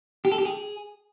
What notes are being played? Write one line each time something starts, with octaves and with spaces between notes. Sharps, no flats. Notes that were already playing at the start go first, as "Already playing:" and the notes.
G4
A4
G4
G#4